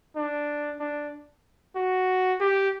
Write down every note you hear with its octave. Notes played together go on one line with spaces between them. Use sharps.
D4
D4
F#4
G4